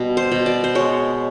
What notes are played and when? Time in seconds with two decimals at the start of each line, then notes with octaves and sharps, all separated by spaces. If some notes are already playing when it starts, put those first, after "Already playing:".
Already playing: B2 G3
0.17 C5
0.32 B2
0.46 D5
0.64 C5
0.75 G#3 C#5